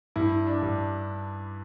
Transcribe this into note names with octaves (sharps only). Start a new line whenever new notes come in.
G2 E4
D4
G2